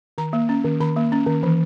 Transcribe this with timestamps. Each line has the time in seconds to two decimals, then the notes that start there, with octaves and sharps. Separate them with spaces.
0.18 D#3 A#5
0.33 A#3
0.49 C#4
0.65 D#3
0.81 D#3 B5
0.96 A#3
1.12 C#4
1.27 D#3
1.43 E3